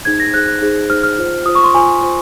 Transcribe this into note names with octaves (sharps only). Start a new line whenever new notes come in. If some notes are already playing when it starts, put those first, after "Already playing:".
D#4 G#4 C5 G#6
A#6
D#4 G#4 C5 F#6
F#6
D#4 G#4 C5
D#4 G#4 C5 F6
F6
F4 C5
F4 C5 D#6
C#6
C6
F4 C5 G#5
F4 C5